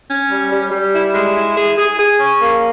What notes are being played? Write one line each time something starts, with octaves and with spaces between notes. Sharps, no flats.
C#4
G3
G3
G3
E4
G#3
E4
G#4
G#4
G#4
C#4
A#3